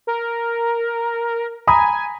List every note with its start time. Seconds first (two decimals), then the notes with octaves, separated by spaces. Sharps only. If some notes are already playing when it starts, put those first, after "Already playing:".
0.07 A#4
1.67 G#5 A#5 B5 D#6